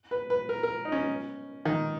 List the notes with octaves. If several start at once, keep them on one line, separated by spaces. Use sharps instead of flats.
B4
B4
A#4
A#4
D#4
C#4
D#3